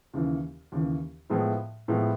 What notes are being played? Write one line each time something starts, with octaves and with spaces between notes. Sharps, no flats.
D#2 C#3 E3
D#2 C#3 E3
A2 F3 G#3 B3 E4
A2 F3 G#3 B3 E4